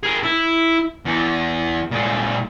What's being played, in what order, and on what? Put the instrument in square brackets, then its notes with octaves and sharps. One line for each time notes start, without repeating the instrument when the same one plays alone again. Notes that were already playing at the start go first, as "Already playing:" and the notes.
[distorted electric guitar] G#4 A#4
E4
E2
A#2 G#3